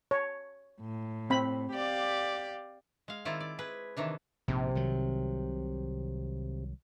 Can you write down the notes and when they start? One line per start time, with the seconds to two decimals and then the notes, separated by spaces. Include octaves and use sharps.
0.11 C#5
0.80 A2
1.30 C4 B5
1.72 G4 D5 F5
3.08 G#3 F5
3.25 D#3 C4 E4 F4 D5
3.40 D5
3.59 G#4 B4
3.97 C3 D#3 E3 D4
4.48 A#1 G#2 C3
4.75 C2 D#3 F#3